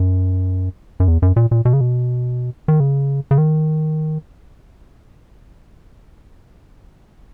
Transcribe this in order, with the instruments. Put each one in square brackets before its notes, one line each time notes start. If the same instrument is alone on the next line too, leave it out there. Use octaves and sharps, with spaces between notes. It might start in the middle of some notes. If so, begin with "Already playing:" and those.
Already playing: [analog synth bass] F#2
F#2
E2
F#2
A#2
A#2
B2
C#3
B2
D#3
C#3
C#3
D#3